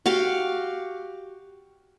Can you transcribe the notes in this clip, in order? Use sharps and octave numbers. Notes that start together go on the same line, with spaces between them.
F#4 G4 F5